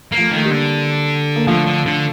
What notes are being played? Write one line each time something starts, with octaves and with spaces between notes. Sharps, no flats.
A#3
F3 A3
D#3 A3
G3 A#3
D3
A#3
D3 F3 A3
D3
D3